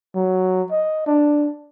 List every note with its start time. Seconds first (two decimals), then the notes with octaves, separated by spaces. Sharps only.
0.14 F#3
0.71 D#5
1.06 D4